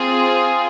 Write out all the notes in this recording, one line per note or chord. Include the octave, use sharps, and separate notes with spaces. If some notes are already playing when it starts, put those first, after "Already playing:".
Already playing: C4 F4 G#4